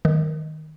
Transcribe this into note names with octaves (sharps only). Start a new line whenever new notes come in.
D#3